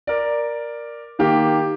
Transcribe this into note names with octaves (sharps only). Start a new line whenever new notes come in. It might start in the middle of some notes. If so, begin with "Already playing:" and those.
A#4 D5
D#3 A#3 G4